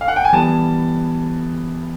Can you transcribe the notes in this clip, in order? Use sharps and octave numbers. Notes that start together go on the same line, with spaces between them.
F5
F#5
G5
G#5
E3 G3 B3 A5